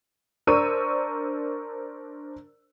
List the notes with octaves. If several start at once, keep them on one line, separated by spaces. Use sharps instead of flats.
D4 A#4 C5 C#6 E6 D#7